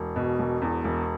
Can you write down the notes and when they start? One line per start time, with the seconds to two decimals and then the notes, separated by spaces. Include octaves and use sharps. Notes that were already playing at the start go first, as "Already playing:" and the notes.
Already playing: E1
0.16 B2
0.39 E1
0.62 E2
0.84 E1